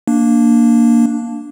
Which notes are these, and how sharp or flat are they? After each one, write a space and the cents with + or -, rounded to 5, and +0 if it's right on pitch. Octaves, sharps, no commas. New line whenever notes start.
A#3 +0 D4 +0